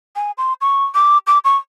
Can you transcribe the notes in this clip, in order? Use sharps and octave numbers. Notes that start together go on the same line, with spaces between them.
G#5
C6
C#6
D6
D6
C#6